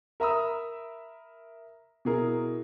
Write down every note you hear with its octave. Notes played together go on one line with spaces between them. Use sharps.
A#4 E5 A#5 B5 D#6 E6
B2 E4 G#4 A#4